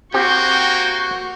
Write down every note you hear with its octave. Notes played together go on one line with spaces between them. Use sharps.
A#3 C4 F#4 G4 G5 C#6 G6